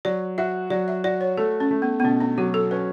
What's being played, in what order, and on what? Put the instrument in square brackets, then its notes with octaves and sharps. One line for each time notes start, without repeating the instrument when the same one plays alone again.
[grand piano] F#3 [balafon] D5
[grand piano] F#4 [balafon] E5
[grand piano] F#3 [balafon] D5
[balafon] E5
[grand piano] F#4 [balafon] D5
[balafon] C#5
[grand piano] A3 [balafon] A4
[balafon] C#4
[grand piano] A3
[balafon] B3
B3
[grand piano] B2 [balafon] C#4
[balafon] D4
[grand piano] F#3 [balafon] F#4
[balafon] A4
[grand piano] C#4 [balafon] B4